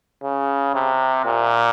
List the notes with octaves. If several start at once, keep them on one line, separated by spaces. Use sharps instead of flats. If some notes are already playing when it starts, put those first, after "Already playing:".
C#3
C3
A#2